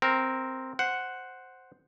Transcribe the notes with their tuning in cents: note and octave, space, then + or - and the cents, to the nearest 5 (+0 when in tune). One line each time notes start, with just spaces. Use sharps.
C4 +0 A#4 +0
C5 +0 F#5 +0